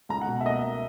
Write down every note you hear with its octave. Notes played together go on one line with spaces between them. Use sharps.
C#2 A#5
F#5
B2
E5
A#3 D#5